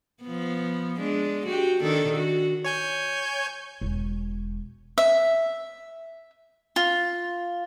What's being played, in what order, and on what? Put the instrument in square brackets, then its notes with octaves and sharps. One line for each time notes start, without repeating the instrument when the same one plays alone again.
[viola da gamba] F3 B3
G#3 D4
F#4 G4
D#3 D4 A4
F#4
[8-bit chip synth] C#5 G#5 G6
[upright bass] E1
[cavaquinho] E5
F4